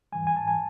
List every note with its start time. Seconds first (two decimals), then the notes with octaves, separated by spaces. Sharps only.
0.12 G#2 E3 G3 G#5
0.27 G#5
0.36 A5
0.48 G#5